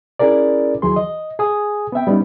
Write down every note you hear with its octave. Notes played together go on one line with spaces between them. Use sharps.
C#4 E4 G#4 A#4 D5
D#2 E3 F#3 G#4 C6
D#5
G#4 G#5 D#6
B3 C4 E5 G5
G3 B3 C#4 D#4